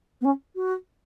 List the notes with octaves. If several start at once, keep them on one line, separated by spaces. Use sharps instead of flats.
B3
C#4
F#4